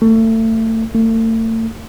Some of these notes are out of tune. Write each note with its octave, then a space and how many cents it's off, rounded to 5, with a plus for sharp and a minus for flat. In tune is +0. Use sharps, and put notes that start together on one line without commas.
A3 +30
A3 +40